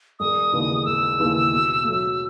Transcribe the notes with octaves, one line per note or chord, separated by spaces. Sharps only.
E1 D#6
D#2 C#3 E3 B3
E1 E6
D#2 C#3 E3 B3
B2
F#3 A3